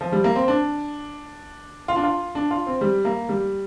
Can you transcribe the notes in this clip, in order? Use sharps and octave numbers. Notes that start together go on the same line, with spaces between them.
F3
G3
A#3
C4
D4
F4
D4
F4
D4
F4
C4
G3
A#3
G3